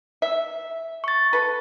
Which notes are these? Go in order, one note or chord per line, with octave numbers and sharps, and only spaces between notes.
E5
C#6 A6
A4 B4